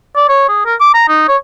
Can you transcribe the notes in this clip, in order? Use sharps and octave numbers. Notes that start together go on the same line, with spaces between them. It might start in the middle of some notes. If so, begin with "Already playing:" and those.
D5
C#5
G#4
A#4
D6
A#5
D#4
C#5